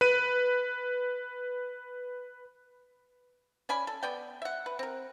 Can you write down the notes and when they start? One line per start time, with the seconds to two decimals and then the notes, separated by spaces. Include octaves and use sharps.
0.01 B4 D#7
3.69 C#4 D5 G#5 B5
3.87 A4
4.03 B3 D5 G5
4.42 E5 F#5
4.66 B4
4.79 C4 A#4